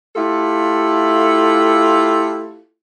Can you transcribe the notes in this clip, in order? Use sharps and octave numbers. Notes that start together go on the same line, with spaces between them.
A3 E4 F4 G4 A4